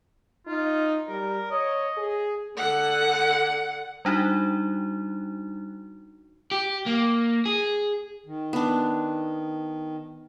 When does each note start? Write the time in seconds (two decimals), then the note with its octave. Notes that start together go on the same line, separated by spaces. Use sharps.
0.47 D#4 F4
1.08 G3 A#4
1.51 C#5 D#5
1.97 G#4
2.57 D3 F#5
4.05 G3 D4 D#4 F#4
6.51 G4
6.86 A#3
7.46 G#4
8.26 D#3
8.53 B3 D4